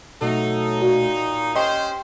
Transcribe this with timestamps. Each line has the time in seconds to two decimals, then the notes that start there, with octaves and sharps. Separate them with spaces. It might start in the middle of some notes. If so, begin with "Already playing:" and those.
0.22 B2 F#3 A3 D#4 A4
0.82 A#2 F#4
1.56 C#4 G4 C5 D#5 G5 C6